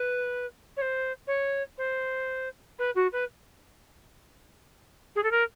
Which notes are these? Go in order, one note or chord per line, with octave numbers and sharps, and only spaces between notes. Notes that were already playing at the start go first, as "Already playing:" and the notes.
Already playing: B4
C#5
C5
C#5
C5
B4
F#4
B4
G#4
A4
A#4